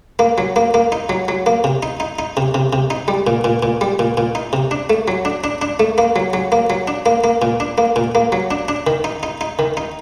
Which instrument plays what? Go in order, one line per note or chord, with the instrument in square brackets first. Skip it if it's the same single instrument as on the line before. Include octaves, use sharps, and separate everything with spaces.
[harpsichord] A#3
F#3
A#3
A#3
D#4
F#3
F#3
A#3
C3
D#4
D#4
D#4
C3
C3
C3
D#4
G3
A#2
A#2
A#2
G3
A#2
A#2
D#4
C3
D4
A3
F#3
D4
D4
D4
A3
A#3
F#3
F#3
A#3
F#3
D4
A#3
A#3
A#2
D4
A#3
A#2
A#3
F#3
D4
D4
D#3
D#4
D#4
D#4
D#3
D#4